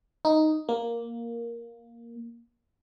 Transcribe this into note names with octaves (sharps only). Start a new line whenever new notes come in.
D#4
A#3